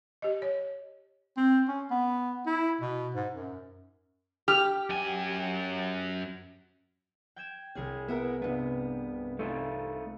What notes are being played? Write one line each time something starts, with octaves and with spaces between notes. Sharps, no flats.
G4 D#5
C#5
C4
C#4
B3
E4
B2
G#2
F#2
G4 F6
F#2 G#5
G5 G#6 E7
C2 C#4 G#4 G#6
B3 E4 A#4
G2 C3 B3
A3 D#4 F4